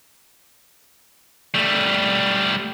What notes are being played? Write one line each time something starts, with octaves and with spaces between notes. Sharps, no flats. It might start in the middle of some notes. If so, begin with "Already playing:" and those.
G3 A3